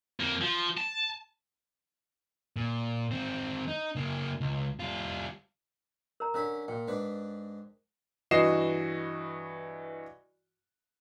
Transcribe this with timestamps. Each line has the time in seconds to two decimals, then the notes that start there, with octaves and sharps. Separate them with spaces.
0.20 F2 A#3
0.41 F3
0.78 A5
2.56 A#2
3.11 D#3 C4
3.68 D#4
3.96 C#3 A#3
4.41 C#2
4.80 G3 F4
6.20 A#4 A#5
6.34 D3 C#4 A#4 B5
6.68 A#2 G5
6.88 G#2 D4 B4
8.31 G2 E3 F#4 D#5 C7 E7